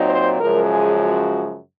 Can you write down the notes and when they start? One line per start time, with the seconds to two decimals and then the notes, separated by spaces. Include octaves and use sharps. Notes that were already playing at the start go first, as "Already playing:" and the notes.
Already playing: A#2 F#3 C4 D#4
0.10 C5
0.40 F#2 C#3 F3 G#3 A#4
0.70 G#4
1.00 F#4